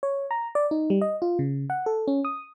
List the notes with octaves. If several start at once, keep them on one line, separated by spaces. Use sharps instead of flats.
C#5
A#5
D5
D#4
G3
D#5
F4
C#3
F#5
A4
C#4
D#6